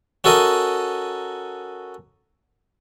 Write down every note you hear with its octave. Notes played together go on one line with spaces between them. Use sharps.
C#4 F#4 A4 A#4 D#5